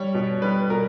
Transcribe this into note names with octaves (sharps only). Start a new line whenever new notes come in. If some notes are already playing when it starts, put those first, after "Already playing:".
Already playing: G3 C#5
B2
G3 B4
B2 A#4